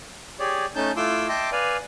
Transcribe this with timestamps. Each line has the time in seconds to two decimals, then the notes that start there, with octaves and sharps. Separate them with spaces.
0.40 G4 G#4 C#5 D5
0.76 A3 C#4 D#4 A5 G6
0.96 A3 E4 F4 C6 D6 E6
1.29 D#5 E5 G5 A5 C6 D6
1.52 B4 D5 F5 G#5